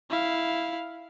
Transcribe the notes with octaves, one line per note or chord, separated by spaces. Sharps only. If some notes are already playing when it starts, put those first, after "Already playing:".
E4 F5